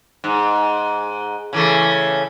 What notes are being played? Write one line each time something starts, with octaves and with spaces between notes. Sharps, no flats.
G#2
C#3 E3 A3